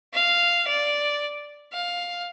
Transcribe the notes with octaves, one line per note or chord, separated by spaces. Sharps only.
F5
D5
F5